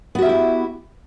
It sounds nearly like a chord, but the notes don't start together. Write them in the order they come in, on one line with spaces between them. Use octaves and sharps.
B3 F#4 E5 G4 E4